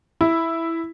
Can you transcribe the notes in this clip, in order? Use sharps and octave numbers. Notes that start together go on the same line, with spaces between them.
E4